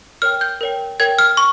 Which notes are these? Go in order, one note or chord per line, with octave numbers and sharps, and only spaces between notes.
A#4 C#5 G5 F6
G6
A#4 C#5 G5
A#4 C#5 G5 G#6
F6
C#6